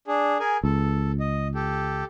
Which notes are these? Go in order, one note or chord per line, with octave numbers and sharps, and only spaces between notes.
D4 G#4
G#4 A#4 G#5
C#2 A4
D#5
G4 A4